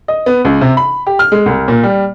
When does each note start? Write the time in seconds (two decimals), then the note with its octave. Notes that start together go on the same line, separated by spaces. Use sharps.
0.08 D#5
0.26 B3
0.45 C#2
0.61 C3
0.77 B5
1.07 G4
1.19 F6
1.32 G#3
1.46 C2
1.68 A#2
1.83 G3